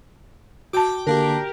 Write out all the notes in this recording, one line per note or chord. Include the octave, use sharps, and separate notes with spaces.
F#4 G5 A5 D6
D3 A#3 D4 G4 A#4